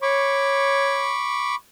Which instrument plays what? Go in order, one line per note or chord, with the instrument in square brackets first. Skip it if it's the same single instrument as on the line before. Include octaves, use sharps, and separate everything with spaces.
[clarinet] C#5 [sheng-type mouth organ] B5 C#6 D6